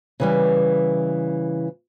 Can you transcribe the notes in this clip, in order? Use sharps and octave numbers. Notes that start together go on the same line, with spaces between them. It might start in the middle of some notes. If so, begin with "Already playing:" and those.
C#3 E3 G3